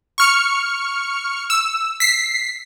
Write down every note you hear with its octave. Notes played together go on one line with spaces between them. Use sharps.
C#6 F6 C#7
E6
B6 C7